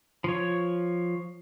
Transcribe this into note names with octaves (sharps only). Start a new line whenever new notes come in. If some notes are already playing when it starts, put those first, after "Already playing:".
F3 C#5